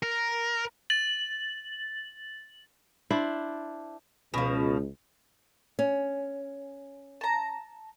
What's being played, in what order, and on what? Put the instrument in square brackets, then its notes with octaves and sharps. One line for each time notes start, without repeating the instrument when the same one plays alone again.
[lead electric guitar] A#4
[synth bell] A6 F#7
[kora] D4 E4 C5
[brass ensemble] C#2 [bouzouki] B2 F3
[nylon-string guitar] C#4
[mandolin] A5 A#5